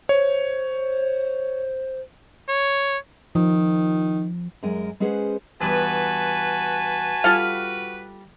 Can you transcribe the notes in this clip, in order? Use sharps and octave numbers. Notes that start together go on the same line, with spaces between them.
C5 C#5
C#5
D#3 F3
F#2 G#3 A#4 G#5
G#3 C#4 G#4 B4 C5 F#5
E2 G2 F#4 B4 G#5 A5
G3 F4 A4 F5